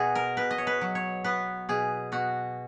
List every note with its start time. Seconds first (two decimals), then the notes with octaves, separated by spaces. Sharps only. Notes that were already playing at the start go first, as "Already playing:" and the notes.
Already playing: B2 B3 F#4 G#4
0.15 A#4
0.37 B2 B4
0.51 D#5
0.58 C#5
0.67 B4
0.81 F#3
0.95 C#5
1.24 B3 B4
1.69 B2 G#4
2.12 B2 F#4